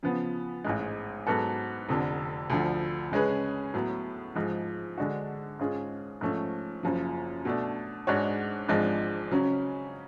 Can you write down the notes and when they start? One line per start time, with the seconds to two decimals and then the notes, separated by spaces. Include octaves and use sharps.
0.03 C#3 F3 B3
0.65 A1 G#2 G#3
1.27 G#2 F#3 B3 F#4 A4
1.89 F1 F2 D3
2.50 D2 D3 F3
3.12 C#3 G#3 C#4 G#4 B4
3.74 A2 F#3 B3
4.35 G#2 F3 G#3
4.97 D3 G#3 D4 F#4
5.59 G#2 G#3 C#4 F4 G#4
6.21 G#2 F3 A3 C#4
6.83 F#1 F#2 F3
7.45 B2 A3 D4
8.07 G#2 G#3 D4 F#4 C#5
8.69 G#1 G#2 F3 G#3 D4
9.31 C#3 F#3 C#4